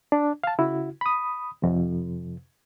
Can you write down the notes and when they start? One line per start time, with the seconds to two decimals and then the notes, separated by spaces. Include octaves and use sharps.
0.12 D4
0.44 F5 A5
0.58 C#3 E4 F#4
1.01 B5 D#6
1.62 F2 C3